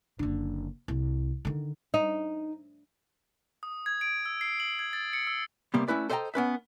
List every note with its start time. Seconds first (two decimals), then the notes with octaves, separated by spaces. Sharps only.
0.19 F#1 D3
0.88 C2
1.45 D3 D#3
1.94 D#4
3.63 D#6
3.86 G#6
4.01 D7
4.26 E6
4.41 C7
4.60 F#7
4.79 G#6
4.93 A6
5.13 C#7
5.27 E6
5.74 C3 G3 A#3 B3
5.88 A3 C#4 E4 B4 D5
6.10 A4 C5 D#5 E5 G5 A#5
6.34 B3 C#4 B4 E5